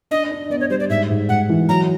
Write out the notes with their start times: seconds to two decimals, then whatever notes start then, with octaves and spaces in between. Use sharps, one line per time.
0.11 D4 D#5
0.31 D4
0.50 B3 D5
0.60 C#5
0.70 G3 C5
0.80 D5
0.90 G#2 E5
1.10 G#2
1.29 G#2 F#5
1.49 E3
1.69 F#3 A#5